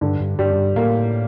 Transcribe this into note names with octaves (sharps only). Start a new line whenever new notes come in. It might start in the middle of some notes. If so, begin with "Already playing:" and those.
G2 D3
G2
G2 G3
F#2
G2
A2 A#3